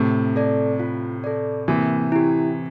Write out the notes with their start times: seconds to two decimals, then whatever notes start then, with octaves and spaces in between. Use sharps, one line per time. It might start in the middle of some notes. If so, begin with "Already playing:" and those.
Already playing: A2 C3
0.36 A4 D5
0.80 F4
1.24 A4 D5
1.68 C3 E3 A#3
2.12 E4 G4